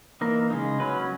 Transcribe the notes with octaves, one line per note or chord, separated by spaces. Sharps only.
E3 A#3 D#4 A#4
C#3 G#3 D#4
F#3 C#4 B4